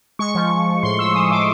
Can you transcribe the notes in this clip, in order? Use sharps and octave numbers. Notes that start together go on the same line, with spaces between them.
G#3 C#6
F3
F3
F3
A2 C6
F3 E6
G#3 D#6
A2 D6